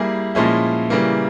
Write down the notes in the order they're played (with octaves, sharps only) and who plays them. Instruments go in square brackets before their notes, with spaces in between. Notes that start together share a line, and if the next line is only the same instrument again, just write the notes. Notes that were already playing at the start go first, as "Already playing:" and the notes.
Already playing: [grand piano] G3 A#3 E4 G#4
A#2 F3 G#3 C#4 E4
C#3 E3 G3 A#3